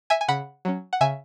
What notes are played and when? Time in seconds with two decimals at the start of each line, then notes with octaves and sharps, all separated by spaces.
0.10 E5 G#5
0.21 G#5
0.28 C#3 F#5 B5
0.65 F#3 C#4
0.93 F#5
1.01 C#3 E5 G#5